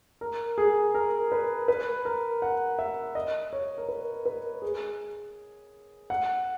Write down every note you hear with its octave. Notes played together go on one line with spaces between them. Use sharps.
A#4
G#4
A#4
B4
B4
A#4
F#5
E5
D#5
C#5
A#4
B4
B4
G#4
F#5